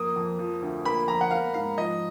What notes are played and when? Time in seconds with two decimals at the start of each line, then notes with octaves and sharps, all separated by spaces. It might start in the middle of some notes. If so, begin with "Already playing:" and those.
Already playing: F2 A#3 D#6
0.16 F2
0.39 F3
0.62 D2
0.85 A#3 B5
1.08 F2 A#5
1.21 F#5
1.31 A#3 F5
1.54 G#2 F5
1.78 F3 D#5